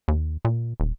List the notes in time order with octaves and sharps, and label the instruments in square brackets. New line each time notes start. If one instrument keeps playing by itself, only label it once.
[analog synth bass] D#2
A#2
D#1